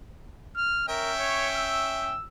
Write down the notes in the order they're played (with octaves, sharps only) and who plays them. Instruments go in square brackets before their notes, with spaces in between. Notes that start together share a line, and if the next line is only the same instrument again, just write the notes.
[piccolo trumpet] F6
[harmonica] C#4 E5 G5 [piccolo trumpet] A#4
[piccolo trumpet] C#5
E6